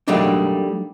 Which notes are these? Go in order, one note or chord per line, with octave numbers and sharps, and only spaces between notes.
F#3 G3 A3 A#3 D4 D#4